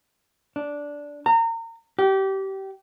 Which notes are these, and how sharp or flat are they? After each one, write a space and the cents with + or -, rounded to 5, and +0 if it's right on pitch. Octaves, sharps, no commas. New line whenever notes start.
D4 -10
A#5 -30
G4 -25